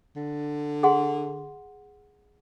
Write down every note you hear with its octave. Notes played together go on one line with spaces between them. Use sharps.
D3
G#4 F#5 C6